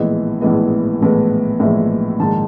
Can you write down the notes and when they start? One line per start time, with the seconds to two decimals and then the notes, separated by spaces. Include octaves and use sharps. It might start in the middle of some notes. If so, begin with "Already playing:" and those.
Already playing: A#1 A2 E3 G#3 B3 D#5
0.41 A#1 A2 E3 G#3 B3 D#5
1.01 A#1 A2 E3 G#3 B3
1.60 A#1 A2 E3 G#3 B3 E5
2.19 A#1 G#2 D#3 A5